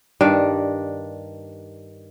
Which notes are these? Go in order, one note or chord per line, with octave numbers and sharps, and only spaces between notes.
G2 D#3 D4